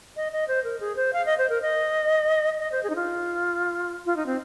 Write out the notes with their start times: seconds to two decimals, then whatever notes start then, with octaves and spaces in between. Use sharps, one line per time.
0.16 D#5
0.32 D#5
0.48 C5
0.64 A#4
0.80 G#4
0.96 C5
1.13 F5
1.26 D#5
1.38 C5
1.49 A#4
1.62 D#5
2.59 D#5
2.72 C5
2.83 G#4
2.90 D#4
2.96 F4
4.06 F4
4.16 D#4
4.26 C4